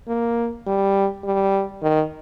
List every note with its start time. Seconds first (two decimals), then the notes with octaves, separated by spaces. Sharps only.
0.08 A#3
0.67 G3
1.24 G3
1.82 D#3